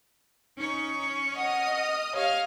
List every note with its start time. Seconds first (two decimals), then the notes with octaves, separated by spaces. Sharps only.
0.58 C#4 D#4 C#5
1.36 D#5 F#5 D#6 F6
2.15 G4 C#5 D#5 F5 F6